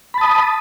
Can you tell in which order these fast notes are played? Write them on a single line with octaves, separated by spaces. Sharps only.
B5 A5 D#6